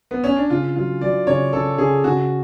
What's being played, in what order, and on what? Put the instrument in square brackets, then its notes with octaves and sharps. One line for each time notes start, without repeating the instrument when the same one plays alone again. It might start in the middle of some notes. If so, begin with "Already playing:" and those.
[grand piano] B3
C#4
D4
[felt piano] C#3 [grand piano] F4
[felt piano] F#3 [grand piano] F4
[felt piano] F#3 [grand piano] D5
[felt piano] C#3 [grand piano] C#5
[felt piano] C#3 [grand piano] A4
[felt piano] C#3 [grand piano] G#4
[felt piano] C#3 [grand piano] F#4